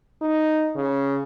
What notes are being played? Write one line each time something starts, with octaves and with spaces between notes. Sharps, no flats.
D#4
C#3